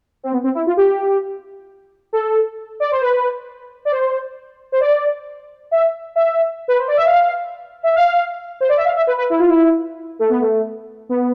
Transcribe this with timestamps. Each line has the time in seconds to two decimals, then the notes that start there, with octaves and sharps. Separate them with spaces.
0.23 C4
0.32 B3
0.44 C4
0.55 E4
0.67 F4
0.77 G4
2.13 A4
2.80 D5
2.91 C5
3.01 B4
3.85 D5
3.92 C5
4.72 C5
4.81 D5
5.71 E5
6.16 E5
6.68 B4
6.78 C5
6.88 D5
6.96 E5
7.06 F5
7.83 E5
7.95 F5
8.61 C5
8.69 D5
8.77 E5
8.85 F5
8.96 E5
9.07 B4
9.18 B4
9.30 E4
9.39 F4
9.49 E4
10.19 A3
10.30 B3
10.41 A3
11.09 B3